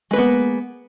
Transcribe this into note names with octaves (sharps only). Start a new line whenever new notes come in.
G#3 A#3 B3 B4